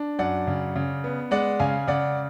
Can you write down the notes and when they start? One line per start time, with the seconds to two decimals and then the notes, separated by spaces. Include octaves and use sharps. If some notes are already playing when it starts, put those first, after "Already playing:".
Already playing: D4
0.19 F#2 D5 F#5
0.47 C#3
0.76 C#3
1.04 B3
1.31 G#3 D5 F#5
1.59 C#3 F5 G#5
1.87 C#3 D5 F#5